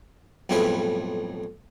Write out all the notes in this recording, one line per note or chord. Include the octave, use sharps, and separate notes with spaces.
B1 F2 A2 G3 G#4 B4